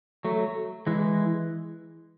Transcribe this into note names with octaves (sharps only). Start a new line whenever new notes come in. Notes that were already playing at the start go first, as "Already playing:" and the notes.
F#3 A3
E3 G#3